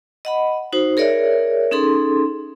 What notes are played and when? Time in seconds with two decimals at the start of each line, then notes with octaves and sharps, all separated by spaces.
0.25 D#5 F#5 B5
0.73 D#4 F#4 C5
0.97 G#4 A#4 C#5 D5 E5
1.71 C#4 D#4 G#4 A4 C6